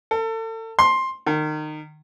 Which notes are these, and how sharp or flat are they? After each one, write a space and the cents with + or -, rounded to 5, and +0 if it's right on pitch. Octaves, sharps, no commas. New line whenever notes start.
A4 +35
C6 +10
D#3 -25